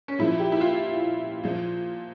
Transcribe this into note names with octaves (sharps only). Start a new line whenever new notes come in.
C#4
A#2 F3 E4
G4
E4
F4
A#2 F3